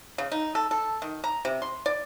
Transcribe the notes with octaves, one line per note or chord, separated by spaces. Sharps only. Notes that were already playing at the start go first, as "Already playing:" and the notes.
C#3
D#4
A4
A4
D#3
A#5
C3
C6
D5